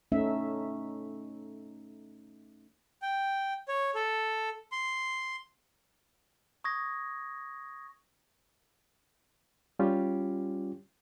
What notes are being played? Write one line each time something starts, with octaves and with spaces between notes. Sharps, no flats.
A3 C#4 D#4 E5
G5
C#5
A4
C6
C#6 D#6 G#6 A#6
G3 C#4 F4 G4